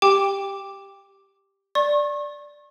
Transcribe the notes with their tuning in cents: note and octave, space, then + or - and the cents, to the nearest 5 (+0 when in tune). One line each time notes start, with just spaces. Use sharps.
G4 +0 G5 +20 D6 +0
D5 +0 C#6 -35